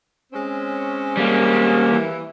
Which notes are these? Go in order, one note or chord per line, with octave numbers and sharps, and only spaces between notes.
G#3 C4 C#4
G3 A#3
E3